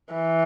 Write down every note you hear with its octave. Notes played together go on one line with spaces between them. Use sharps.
E3